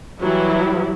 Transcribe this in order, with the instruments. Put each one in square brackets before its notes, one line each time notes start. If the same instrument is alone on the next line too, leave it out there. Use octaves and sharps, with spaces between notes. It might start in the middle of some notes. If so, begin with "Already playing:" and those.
[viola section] E3 F#3 G3 E4